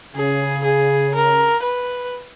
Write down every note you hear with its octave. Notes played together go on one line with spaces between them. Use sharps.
C#3 G#4
G#4
A#4
B4